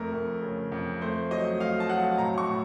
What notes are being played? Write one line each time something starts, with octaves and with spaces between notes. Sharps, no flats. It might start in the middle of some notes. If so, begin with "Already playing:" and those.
Already playing: F2 A3 A#4
F2
C#3
F2
A3 C5
F#3 D#5
A3 F5
A5
F#3 F#5
A2 A#5
C#6
A2